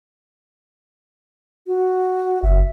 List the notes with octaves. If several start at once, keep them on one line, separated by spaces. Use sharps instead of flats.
F#4
F#1 E5